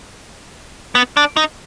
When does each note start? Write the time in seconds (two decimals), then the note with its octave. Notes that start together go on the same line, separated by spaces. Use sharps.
0.95 B3
1.17 D4
1.37 D#4